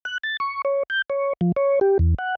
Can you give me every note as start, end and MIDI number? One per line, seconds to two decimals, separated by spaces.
0.05 0.18 90
0.23 0.37 93
0.40 0.62 85
0.65 0.83 73
0.90 1.02 91
1.10 1.33 73
1.41 1.52 53
1.56 1.79 73
1.81 1.98 67
1.99 2.14 40
2.19 2.35 78